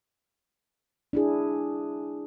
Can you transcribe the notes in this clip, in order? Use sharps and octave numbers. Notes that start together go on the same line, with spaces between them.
D4 E4 G#4